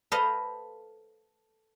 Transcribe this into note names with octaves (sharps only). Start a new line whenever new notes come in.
A4 B4 C5 D#5 F5